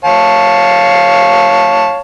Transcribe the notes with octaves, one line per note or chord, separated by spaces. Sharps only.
C#5 F5 A5